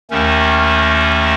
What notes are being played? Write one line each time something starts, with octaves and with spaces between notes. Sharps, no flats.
D#2 D#3 A3 C#4